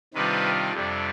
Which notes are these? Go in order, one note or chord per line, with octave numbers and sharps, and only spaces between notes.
C3 D#3 G3 D4 F4 B4
F2 C3 G3 D4